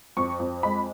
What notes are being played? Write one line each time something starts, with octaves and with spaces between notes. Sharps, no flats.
F2 C#6
F2
G#3 B5